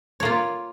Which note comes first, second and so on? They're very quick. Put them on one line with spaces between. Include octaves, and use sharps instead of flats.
C#5 A#3 F4